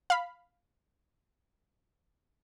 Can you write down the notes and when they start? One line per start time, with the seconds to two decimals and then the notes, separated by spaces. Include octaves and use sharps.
0.10 F5 B5